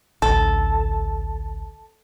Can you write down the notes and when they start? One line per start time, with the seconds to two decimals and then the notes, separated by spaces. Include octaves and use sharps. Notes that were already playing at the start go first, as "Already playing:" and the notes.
0.22 A1 D2 A4